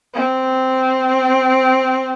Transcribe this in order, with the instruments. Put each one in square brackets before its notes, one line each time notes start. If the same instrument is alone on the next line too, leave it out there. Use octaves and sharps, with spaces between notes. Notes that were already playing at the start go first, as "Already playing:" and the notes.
[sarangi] C4